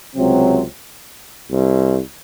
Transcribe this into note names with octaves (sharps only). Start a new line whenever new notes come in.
C#2 C3 F#3 C4
C2